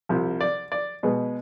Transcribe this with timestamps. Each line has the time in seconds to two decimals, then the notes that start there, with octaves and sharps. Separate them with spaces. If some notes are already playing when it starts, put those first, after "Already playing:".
0.09 C2 C3 F3
0.41 D5
0.72 D5
1.03 B2 G#3 B3